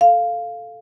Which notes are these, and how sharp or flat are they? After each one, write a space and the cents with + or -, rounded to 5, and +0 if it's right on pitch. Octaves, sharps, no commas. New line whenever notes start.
A4 +0 F5 +0